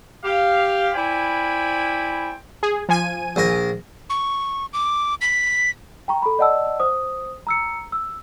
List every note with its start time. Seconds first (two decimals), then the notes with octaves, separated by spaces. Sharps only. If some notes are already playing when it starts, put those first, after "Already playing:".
0.25 G4 F5
0.95 E4 C5 D5 G5 G#5 B5
2.63 G#4
2.89 F3 G#5 D#7
3.36 A#1 A#4
4.10 C#6
4.73 D6
5.21 B6
6.08 G5 A#5 C#6
6.22 A4 B5
6.39 D5 D#5 F#5 A5 E6
6.80 C5 D#6
7.47 A#5 E6 C#7
7.92 E6